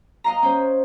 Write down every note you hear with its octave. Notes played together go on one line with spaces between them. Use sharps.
D#5 F5 A#5
C#4 C5